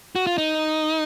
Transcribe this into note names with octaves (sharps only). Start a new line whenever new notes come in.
F#4
F4
D#4